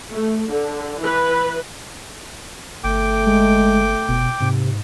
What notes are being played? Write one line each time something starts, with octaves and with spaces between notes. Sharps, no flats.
A3
D3
E3 B4
G1 A3 G5 D6
G#3
F1 B2
G#2 C3